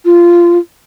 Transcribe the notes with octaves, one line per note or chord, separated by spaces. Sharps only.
F4